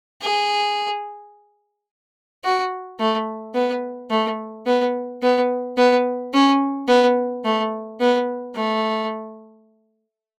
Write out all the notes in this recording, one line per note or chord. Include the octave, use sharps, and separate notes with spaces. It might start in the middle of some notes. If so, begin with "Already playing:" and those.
G#4
F#4
A3
B3
A3
B3
B3
B3
C#4
B3
A3
B3
A3